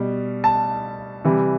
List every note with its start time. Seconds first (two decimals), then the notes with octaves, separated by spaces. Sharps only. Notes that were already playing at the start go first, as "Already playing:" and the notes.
Already playing: B2 G3
0.44 A5
1.24 C3 E3 G3